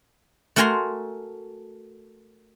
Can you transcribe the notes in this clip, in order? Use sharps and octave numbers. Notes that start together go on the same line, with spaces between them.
A3 F#4 A#4 G#5 A#5 C6